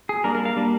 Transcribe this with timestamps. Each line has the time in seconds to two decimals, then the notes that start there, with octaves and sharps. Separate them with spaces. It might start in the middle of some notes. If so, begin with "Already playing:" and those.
0.09 G#4
0.24 G3 A#3 D4 A#4
0.35 A#4
0.45 F5
0.56 G3 A#3 D4